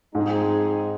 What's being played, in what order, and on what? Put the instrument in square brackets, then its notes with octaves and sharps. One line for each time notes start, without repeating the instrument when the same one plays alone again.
[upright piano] G#2 [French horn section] F3 G#3 C4 D#4 G#4